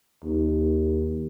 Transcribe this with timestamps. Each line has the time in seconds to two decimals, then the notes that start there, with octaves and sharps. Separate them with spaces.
0.24 D#2